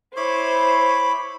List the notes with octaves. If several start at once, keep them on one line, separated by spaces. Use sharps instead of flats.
E4 C5 C#5 B5 D6